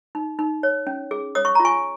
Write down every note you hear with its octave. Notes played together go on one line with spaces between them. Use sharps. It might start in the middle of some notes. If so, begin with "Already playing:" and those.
D#4
D#4
C#5
C#4
G#4
C#5 D#6
C#6
F4 A#5
G#5 C#6